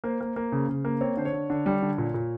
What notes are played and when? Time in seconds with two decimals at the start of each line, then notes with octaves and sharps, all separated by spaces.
0.04 A#3 C5
0.21 A#3
0.36 A#3
0.52 C#3
0.69 C#3
0.85 A#3
1.01 C4 C#5
1.17 D3 C5
1.25 C#5
1.33 D3
1.50 D3
1.66 G3
1.82 D3
1.98 A#2
2.14 A#2